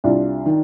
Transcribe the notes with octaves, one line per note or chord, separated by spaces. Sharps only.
C2 D4 F4
D#3